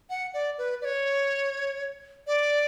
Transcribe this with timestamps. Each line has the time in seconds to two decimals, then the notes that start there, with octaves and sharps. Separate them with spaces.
0.10 F#5
0.34 D5
0.58 B4
0.82 D5
0.85 C#5
2.27 D5